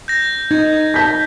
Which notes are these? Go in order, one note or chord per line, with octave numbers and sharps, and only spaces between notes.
G6 A#6
D#4 G#6
A5 G6 B6